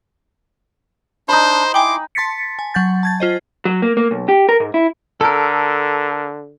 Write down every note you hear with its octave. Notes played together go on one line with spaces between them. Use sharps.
D4 D#4 C5 B5
E4 G5 G#5 C6 D6
A5 C6 A6 B6 C#7
G#5
F#3 F#5 G6 A6
A5 G#6 A6
F4 C5 D#5
F#3
A#3
A#3
B1
G4
A#4
G#2
E4
D3 A4 A#4